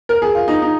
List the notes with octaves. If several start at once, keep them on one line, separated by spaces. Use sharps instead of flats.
A#4
G#4
F4
D#4
D#4